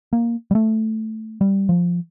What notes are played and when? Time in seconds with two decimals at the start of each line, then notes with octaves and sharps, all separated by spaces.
0.13 A#3
0.51 G3
0.55 A3
1.41 G3
1.69 F3